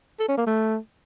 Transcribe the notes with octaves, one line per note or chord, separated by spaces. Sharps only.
A4
C#4
A#3
A3